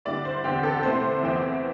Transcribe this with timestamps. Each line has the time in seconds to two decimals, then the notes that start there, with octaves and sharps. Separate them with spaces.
0.05 D3 G3 E4 D5
0.25 C5
0.44 E2 D3 C4 G4
0.63 A4
0.83 C3 A3 E4 C5
1.23 E2 E3 C4 E4